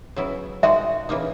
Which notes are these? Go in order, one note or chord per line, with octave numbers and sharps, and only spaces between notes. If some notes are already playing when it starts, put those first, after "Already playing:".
C#3 F#3 B3 E4
A#2 G#3 D#4 F#4 E5
C#3 E3 A#3 D#4